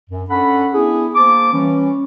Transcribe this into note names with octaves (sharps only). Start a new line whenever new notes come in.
F#2
C#4 D4 A4 F#5 B5
B3 D4 E4 G#4
A#3 C5 A5 D6
E3 G3 C#4